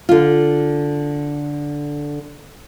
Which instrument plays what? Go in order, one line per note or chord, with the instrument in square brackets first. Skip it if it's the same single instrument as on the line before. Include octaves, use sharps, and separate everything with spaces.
[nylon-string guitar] D3 F4